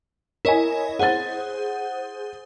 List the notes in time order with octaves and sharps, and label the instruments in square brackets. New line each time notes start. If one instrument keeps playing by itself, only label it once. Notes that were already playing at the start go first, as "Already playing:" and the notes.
[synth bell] E4 C#5 D#5 [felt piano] A#4 G#5
[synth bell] G#4 C5 [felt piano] F#5 A6